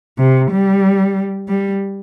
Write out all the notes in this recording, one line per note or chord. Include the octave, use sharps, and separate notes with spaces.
C3
G3
G3